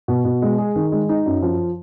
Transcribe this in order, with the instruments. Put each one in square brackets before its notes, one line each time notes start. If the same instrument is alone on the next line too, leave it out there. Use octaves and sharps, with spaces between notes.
[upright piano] B2
B2
G#3
G#4
D#3
G#3
D#4
F#2
F3